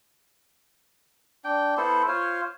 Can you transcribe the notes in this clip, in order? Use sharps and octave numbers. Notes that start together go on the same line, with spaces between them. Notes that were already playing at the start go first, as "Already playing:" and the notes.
D4 G5
B3 E4 A4 C5
F4 C5 C#5